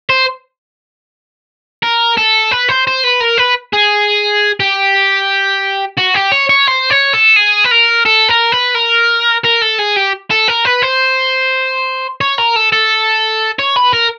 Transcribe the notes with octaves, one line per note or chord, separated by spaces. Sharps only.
C5
A#4
A4
B4
C5
C5
B4
A#4
B4
G#4
G4
F#4
G4
C#5
C#5
C5
C#5
A4
G#4
B4
A#4
A4
A#4
B4
A#4
A#4
A4
G#4
G4
A4
A#4
B4
C5
C#5
A#4
A4
A4
C#5
B4
A#4